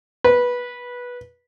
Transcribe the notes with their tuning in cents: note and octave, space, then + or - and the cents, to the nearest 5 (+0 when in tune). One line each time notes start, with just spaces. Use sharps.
B4 -15